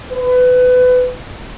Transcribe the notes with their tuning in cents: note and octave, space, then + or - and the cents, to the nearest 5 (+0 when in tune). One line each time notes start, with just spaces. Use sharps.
B4 +25